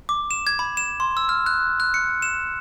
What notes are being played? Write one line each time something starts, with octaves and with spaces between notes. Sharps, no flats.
D6
E7
G#6
B5
E7
C6
E6
F6
F#6
F#6
C#7
E7